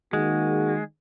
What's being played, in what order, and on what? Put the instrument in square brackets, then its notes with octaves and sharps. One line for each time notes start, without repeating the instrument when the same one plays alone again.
[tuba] D#3 [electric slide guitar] G#3 [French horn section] A#3 G#4 [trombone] F#4